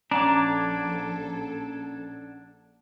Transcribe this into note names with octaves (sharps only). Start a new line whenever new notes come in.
A#1 C#4 D4 A4 F#5 A#5 D6 G#6